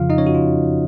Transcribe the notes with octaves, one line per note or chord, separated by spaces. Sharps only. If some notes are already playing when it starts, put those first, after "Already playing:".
Already playing: F2 C#3 F3 F4 F5
D#4 D#5
C#4 C#5
F#4
F4